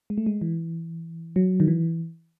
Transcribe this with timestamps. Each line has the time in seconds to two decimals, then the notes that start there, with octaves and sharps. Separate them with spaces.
0.10 G#3
0.17 A3
0.26 G#3
0.41 E3
1.36 F#3
1.60 D#3
1.68 E3